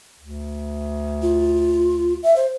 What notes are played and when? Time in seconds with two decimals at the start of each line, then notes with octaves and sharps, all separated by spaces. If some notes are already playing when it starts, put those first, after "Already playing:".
0.19 D2
1.22 F4
2.23 E5
2.36 C5